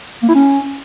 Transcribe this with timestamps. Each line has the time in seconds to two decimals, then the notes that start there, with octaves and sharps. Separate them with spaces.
0.22 A#3
0.28 E4
0.34 C#4